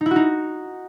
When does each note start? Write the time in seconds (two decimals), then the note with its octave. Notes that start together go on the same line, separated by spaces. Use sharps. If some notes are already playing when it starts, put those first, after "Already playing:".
0.01 D#4
0.06 E4
0.11 F#4
0.16 D#4